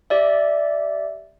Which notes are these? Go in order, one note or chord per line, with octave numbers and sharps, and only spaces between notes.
G4 D5 E5